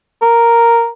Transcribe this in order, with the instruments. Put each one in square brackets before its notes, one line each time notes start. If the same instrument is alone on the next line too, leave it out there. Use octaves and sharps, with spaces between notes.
[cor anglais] A#4